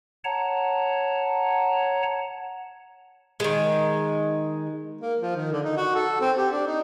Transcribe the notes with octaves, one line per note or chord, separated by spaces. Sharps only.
C#5 F#5 A5 A#5
D#3 G#3
A#3
F3
D#3
D3
D#4
F#4
A4
C4
G4
D4
D#4